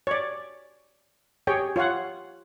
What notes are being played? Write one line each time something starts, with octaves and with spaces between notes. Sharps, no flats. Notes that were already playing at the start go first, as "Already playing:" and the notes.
C#5 D5
G4 G#4 C#5 G5
F4 C#5 F5 F#5